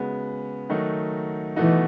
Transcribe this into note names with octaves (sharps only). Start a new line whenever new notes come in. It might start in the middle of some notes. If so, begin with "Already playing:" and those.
Already playing: C#3 G#3 B3 F#4
D#3 F#3 A3 D#4 F#4
B2 E3 A3 D#4 F#4